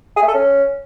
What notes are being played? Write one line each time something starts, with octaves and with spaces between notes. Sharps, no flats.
G#4
A3
A4
C#4